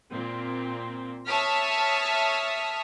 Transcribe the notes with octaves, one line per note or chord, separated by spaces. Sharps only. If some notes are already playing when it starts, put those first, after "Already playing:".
A#2 C4
C#5 E5 A5 D#6 F6 B6